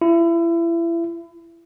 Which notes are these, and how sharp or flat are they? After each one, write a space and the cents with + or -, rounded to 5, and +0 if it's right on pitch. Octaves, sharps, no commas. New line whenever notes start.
E4 +30